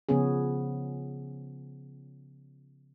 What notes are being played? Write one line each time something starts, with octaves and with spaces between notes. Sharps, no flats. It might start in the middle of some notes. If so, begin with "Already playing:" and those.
C#3 F3 B3 C#4 G#4